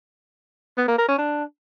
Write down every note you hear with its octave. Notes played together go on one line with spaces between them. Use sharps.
B3
A#3
A#4
C#4
D4